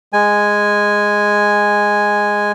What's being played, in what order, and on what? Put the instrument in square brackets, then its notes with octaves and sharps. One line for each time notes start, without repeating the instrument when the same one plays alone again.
[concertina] G#3 G#5